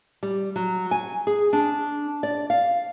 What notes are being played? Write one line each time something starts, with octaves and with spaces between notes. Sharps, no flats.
G3
F#3
G#5
G#4
D4
D5
F5